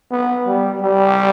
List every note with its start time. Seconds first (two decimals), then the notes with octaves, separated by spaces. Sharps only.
0.11 B3
0.46 G3
0.82 G3